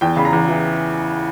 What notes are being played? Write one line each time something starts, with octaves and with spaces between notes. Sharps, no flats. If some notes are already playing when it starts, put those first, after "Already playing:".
E2 G5
C#3 B5
A#5
E2
E3